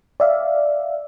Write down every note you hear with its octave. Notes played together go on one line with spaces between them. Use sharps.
D5 E5 F5